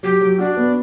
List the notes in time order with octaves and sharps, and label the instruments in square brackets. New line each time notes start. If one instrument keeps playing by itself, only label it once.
[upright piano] F#3 [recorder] G4
[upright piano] F#3
[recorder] D4 [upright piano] F#4
[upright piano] B3